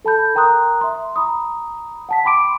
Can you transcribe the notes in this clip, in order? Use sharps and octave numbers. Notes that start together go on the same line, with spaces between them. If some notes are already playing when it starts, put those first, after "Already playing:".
A4 A5 B5 G6
A#4 G5 A#5 C6 D#6 F#6
E5 C6
A#5 B5 D#6
F#5 A5 B6
G5 B5 C6 D6 D7